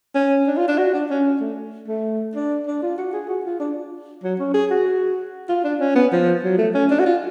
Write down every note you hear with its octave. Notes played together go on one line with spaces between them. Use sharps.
C#4
D4
F4
D4
F#4
D4
C#4
A3
A3
D4
D4
F4
F#4
G#4
F#4
F4
D4
F#3
C#4
G#4
F#4
F4
D4
C#4
B3
F3
F#3
A3
C#4
D4
F#4
F4